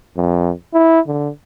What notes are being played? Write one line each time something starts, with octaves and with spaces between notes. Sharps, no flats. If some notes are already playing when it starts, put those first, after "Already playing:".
F2
E4
D3